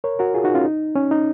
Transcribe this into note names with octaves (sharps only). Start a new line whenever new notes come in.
A#4 C#5
F#4 A#4
F4 G#4
D#4 F#4
C#4 F4
D#4
C#4
D#4